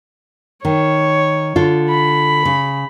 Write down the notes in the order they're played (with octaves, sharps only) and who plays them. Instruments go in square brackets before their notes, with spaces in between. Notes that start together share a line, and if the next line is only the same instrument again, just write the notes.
[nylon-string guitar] D#3 [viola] C#5
[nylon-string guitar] D3 F4
[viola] B5
[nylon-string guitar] C#3